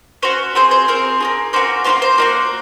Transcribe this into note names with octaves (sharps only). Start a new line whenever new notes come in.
C#4 F#4 C5
C4 F4 G#4 C5
C5
C4 F4 G#4 A#4
A#3 F4 G#4
A#3 C#4 F#4 C5
A#3 C#4 F4 C5
C5
A#3 D#4 F#4